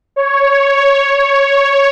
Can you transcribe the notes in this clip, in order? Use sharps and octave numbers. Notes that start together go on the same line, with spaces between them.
C#5
C#5